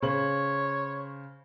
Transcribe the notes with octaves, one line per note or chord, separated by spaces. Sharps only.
C#3 C5 C#5 F#7